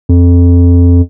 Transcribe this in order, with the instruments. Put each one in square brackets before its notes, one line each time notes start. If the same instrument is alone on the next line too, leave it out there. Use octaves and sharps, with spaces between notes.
[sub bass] F2